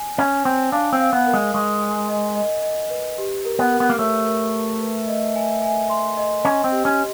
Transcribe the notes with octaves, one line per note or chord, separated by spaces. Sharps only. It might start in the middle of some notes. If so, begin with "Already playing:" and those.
Already playing: G#5
C#4 C#5
C4 G#5
D4 F5
C4
F5
B3
A#4
G#3
G#3 C#6
G#5
D#5
D#5
D#5
B4
G4
A#4
B3
A#4
B3
A#3
A3 C#5
A#4
A#4
B4
D#5
G#5
G#5
C6
D#5
C#4 D#5
C4
G4
C#4